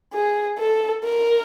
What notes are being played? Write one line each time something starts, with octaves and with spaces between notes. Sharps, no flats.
G#4
A4
A#4